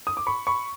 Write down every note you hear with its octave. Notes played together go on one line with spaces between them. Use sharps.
D#6
D6
B5 C#6
B5 C#6